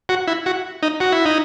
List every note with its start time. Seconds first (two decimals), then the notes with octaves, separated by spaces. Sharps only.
0.09 F#4
0.27 E4
0.46 F#4
0.83 D#4
1.00 F#4
1.12 E4
1.26 D#4